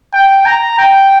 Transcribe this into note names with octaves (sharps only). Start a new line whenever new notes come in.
G5
A#5
G5